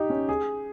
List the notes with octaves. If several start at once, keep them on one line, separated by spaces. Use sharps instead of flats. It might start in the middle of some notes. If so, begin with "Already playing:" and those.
Already playing: D#4 G4
C#4
G#4